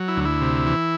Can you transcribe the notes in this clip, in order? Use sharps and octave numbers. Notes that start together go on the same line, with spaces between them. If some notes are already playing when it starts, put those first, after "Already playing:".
Already playing: F#3
E4
D2
E4
C3
E3